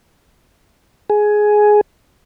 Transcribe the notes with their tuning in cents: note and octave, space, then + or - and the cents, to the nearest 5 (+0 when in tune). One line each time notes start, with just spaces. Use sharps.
G#4 +10